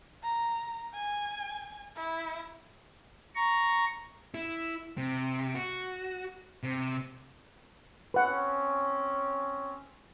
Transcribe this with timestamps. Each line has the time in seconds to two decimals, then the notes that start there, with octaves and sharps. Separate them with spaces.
0.23 A#5
0.94 G#5
1.96 E4
3.35 A#5 C#6
4.34 E4
4.97 C3
5.55 F#4
6.63 C3
8.14 C4 C#4 B4 F#5